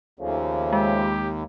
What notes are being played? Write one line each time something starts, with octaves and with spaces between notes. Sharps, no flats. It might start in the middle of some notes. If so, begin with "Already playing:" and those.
D#2 C#3 F3 A3
G#3 G4